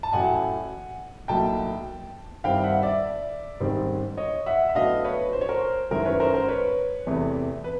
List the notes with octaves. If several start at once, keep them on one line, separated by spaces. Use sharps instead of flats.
A5
A1 A2 F#3 F#5 G#5
B1 A2 F#3 A#3 G5 A5
G2 D#3 G3 C4 E4 F5 G5
E5 F#5
D5 E5
A1 G#2 D#3 G3 C4
C#5 D#5
E5 F#5
E5
A2 F#3 B3 D4 D#5 F5
B4 C#5
C5
C#5
A#4 C5
F#2 D#3 G#3 C#4 E4 A#4 C5
B4 C#5
A#4 C5
A#4 C5
B4 C#5
E2 C3 E3 A3
B4